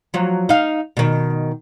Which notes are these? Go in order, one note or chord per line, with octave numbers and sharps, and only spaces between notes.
F3 F#3
D#4 F5
B2 D#3